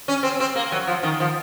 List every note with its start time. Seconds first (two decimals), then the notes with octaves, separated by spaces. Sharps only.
0.08 C#4
0.23 C4
0.40 C4
0.56 A#3
0.72 F#3
0.87 F3
1.03 D#3
1.20 F3